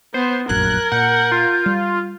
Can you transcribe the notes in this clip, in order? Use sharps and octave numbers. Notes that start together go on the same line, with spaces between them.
B3 C5
F1 A#1 F#2 A#4 F#6 G#6
A#2 F#5 G6
F4
G3